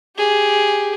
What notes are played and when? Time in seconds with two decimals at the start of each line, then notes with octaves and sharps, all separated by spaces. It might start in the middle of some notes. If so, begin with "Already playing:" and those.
0.17 G4 G#4